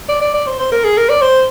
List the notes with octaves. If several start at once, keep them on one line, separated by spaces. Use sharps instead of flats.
D5
D5
D5
C5
C5
A#4
G#4
A#4
D5
C5